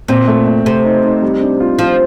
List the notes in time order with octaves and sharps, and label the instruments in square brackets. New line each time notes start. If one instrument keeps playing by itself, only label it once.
[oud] A#2 [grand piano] C4
[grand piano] A3
A3
[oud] C3 [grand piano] A3
[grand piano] D#4
D#4
G3
D4
F4
[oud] F3 [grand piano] F4